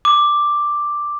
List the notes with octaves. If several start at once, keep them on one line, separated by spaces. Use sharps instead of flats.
D6